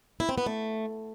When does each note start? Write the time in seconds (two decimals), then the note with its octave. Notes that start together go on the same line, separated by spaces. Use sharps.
0.20 E4
0.29 C4
0.38 B3
0.46 A3